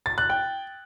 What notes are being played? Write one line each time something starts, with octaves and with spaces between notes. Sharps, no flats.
A6
F#6
G5